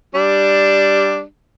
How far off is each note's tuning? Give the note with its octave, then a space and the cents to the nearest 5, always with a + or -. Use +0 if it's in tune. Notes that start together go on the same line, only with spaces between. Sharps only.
G3 +0 D4 +0